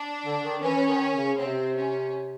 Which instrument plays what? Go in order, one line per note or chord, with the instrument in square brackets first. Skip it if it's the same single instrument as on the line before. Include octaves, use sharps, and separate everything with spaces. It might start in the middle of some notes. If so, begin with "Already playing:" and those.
Already playing: [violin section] D4
[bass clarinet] D3
D#3
[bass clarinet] E3 [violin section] C#4
[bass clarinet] E3
D#3
C#3
[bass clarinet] C3 [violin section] C4
[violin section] C#4